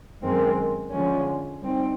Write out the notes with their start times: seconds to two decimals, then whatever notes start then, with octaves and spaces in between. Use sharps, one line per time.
0.21 F#2 D#3 G#3 C4
0.90 D3 F3 G#3 C#4
1.60 G3 C4 D#4